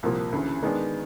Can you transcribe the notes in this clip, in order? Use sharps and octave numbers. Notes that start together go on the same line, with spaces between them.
C2 A#2 F3 A#3
D2 C#3 E3
D#3 G#3 B3 D4